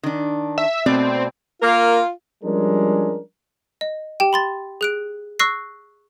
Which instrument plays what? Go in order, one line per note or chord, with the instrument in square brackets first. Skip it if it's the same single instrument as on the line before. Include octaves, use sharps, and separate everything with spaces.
[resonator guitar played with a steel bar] D#3 D4
[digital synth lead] E5
[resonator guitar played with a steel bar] B2 A3 D5 [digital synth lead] C4
[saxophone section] A#3 A#4 [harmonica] F4
[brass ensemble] F3 G3 G#3 C#4 D4 A#4
[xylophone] D#5
G4 G5
B5 C6 A6
G#4 F#6 D7
C#6 E6 F#6 A#6 C7